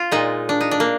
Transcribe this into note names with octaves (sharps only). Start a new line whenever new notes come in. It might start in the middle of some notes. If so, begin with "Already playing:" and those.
Already playing: F4
A#2 G#3 D#4
D4
D#4
D4
A#3